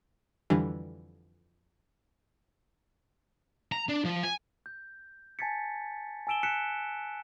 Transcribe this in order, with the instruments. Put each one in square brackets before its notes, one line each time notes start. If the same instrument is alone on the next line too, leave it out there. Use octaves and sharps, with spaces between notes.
[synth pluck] F2 D3 E3 G3 D4
[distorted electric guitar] A#5
D4
F3
G#5
[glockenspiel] G6
G#5 A5 G#6 A6 B6 C#7
G#5 A5 E6 D7 E7 G7
F#6 B6 C#7 E7